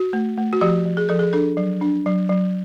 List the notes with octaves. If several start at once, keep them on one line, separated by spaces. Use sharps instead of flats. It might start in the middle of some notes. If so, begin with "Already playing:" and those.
Already playing: F#4
A3
A3
F#4
F3 G4
F3
G#4
F3 A4
G#4
D4 A4
F#3
D4
F#3
F#3